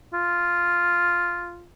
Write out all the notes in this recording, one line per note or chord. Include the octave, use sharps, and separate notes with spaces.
F4